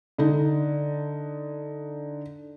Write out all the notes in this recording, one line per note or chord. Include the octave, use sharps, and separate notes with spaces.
D3 D#4